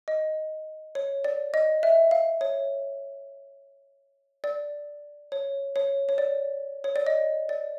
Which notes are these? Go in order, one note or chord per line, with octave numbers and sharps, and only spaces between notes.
D#5
C#5
D5
D#5
E5
F5
C#5
D5
C#5
C#5
C#5
D5
C#5
D5
D#5
D5